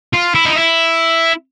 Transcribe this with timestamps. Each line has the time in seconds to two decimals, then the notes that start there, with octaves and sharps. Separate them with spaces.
0.14 F4
0.35 E4
0.46 D#4
0.55 E4